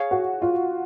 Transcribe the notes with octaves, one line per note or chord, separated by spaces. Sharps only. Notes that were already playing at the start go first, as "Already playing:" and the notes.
Already playing: G#4 C#5 F5
F#4
F4